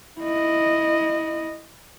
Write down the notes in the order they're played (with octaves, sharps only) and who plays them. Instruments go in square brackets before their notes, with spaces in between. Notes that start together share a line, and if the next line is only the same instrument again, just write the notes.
[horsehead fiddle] E4 D#5